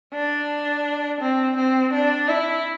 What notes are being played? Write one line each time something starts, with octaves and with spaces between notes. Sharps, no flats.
D4
C4
C4
D4
E4